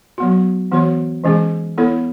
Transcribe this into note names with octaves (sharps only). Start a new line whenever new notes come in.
F#3 B3 F#4
E3 B3 F#4 C#5
E3 G#3 C#4 G#4
B3 E4 A4 C#5